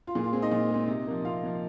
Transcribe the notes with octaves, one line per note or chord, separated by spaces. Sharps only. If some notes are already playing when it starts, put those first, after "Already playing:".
F4
A#2 G#4
F4
G#3 C4 G#4
D#4 D#5
A#2
G#3 C4
C3
F3 A#3
C3 F4 F5
F3 A#3